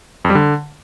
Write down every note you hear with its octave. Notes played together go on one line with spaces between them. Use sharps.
F2
G3
D3